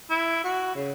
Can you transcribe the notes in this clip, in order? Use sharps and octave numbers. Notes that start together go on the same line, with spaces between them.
E4
F#4
C#3